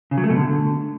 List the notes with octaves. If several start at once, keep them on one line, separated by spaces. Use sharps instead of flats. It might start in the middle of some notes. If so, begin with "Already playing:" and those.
C#3
F#3
A3
B2
D3